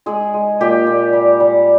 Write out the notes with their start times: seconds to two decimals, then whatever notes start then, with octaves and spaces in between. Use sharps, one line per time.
0.06 G#3 G#4
0.34 G#3
0.61 A#2 G4
0.87 A#2
1.13 G3
1.40 G3